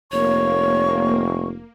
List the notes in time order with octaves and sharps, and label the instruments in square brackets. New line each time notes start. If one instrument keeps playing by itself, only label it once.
[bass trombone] F1 [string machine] A#3 [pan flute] C#5 [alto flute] C#6